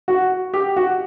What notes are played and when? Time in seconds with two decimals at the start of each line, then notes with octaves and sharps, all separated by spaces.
0.08 F#4
0.54 G4
0.76 F#4